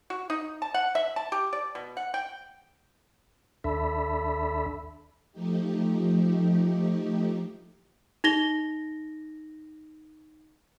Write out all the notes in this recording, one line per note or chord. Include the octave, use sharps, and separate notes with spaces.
F#4
D#4
A5
F#5
E5
A5
G4
D5
B2
F#5
G5
D#2 D4 A4 E5 B5
F3 A3 D#4 G4
D#4 A#6 G7